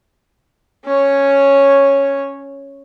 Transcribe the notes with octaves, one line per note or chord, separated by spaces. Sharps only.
C#4 C#5